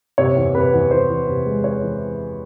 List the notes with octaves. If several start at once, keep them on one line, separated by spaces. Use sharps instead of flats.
C3 C#5
E2
C3 B4
E2
E2 C5
E3
C3
G#3
E3 C#5
E3